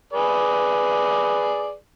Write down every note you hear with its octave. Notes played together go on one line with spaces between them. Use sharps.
G#4 B4 D5